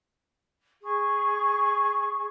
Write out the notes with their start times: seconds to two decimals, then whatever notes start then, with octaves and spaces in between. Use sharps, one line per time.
0.82 G#4 C#6